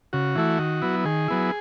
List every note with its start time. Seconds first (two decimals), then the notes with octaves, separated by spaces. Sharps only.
0.13 C#3 F#4
0.35 E3 A3 E4
0.59 D#3
0.82 F#3 B3 E4
1.05 D#3 G#4
1.28 F#3 B3 E4